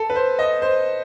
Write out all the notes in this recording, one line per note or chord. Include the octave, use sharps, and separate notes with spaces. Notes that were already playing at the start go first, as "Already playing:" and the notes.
Already playing: A4
B4
C5
D#5
C5